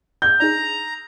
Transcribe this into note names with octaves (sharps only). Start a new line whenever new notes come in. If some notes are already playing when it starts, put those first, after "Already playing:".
G6
D4 D#4 G#4 A#5